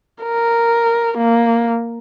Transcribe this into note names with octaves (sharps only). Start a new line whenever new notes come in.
A#4
A#3